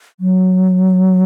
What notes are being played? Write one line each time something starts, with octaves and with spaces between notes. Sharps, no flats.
F#3